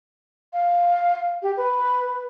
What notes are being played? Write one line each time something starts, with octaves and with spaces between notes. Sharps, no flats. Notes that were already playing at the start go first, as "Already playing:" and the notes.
F5
G4
B4